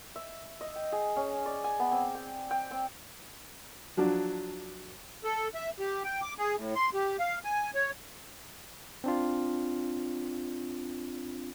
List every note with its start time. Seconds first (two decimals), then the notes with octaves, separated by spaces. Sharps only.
0.16 E5
0.61 D#5
0.76 G5
0.92 G#4
1.16 C#4
1.46 D5
1.64 G#5
1.79 B3
1.92 C4
2.15 G5
2.51 G5
2.71 C4
3.97 F3 F#3 D4
5.24 A4
5.55 E5
5.79 G4
6.04 G5
6.22 D6
6.38 G#4
6.56 A2
6.75 C6
6.94 G4
7.20 F5
7.44 G#5
7.75 C#5
9.04 C4 D4 F4